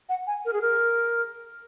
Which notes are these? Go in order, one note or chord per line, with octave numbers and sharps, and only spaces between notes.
F#5
G#5
A#4
G#4
A#4